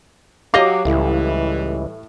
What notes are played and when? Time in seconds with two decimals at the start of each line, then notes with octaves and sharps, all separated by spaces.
0.54 F#3 G4 D#5 F5 D6
0.85 C#2 A2 E3 G3